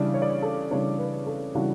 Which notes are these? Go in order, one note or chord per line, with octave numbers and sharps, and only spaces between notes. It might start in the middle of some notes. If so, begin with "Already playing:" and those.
Already playing: C#3 E3 G3 D4 D5
C#5
D5
C#5
A4
C#3 E3 G3 D4 C#5
B4
A4
C#3 E3 G3 D4 F#4